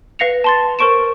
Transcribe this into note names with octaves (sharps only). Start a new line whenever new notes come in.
B4 F5 A#6 C#7 F7
A5 C6 A6
A#4 C5 C#6 D7 E7